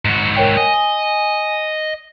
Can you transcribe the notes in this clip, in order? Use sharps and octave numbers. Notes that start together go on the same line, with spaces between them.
G#2 F#4
A#4 C#5 G5
D#5 G#5